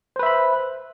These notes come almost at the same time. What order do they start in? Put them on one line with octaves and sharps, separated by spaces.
C5 B4 E5 B5